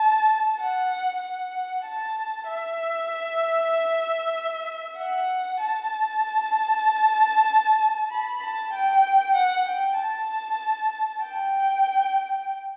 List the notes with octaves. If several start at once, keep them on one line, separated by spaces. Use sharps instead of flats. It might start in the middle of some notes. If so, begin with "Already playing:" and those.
Already playing: A5
F#5
F#5
A5
E5
F#5
A5
B5
A5
G5
F#5
G5
A5
G5